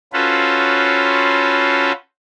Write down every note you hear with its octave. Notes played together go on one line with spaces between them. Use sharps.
C#4 F4 F#4 A4 B4 C5